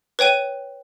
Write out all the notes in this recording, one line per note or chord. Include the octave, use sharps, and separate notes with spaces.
B4 C#5 G5 D#7